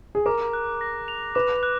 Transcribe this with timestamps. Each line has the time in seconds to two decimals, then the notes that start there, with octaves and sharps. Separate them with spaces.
0.15 G#4
0.26 A#4 D6
0.53 F#6
0.81 A#6
1.08 F7
1.35 B4 D6
1.63 F#6